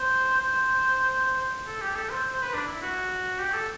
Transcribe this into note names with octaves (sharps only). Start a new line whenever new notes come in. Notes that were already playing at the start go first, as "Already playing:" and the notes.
Already playing: C5
C5
C5
C5
A4
G4
A4
C5
C5
B4
D4
E4
F#4
G4
A4